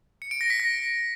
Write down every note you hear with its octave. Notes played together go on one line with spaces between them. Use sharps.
C#7
D7
A#6
B6
A#6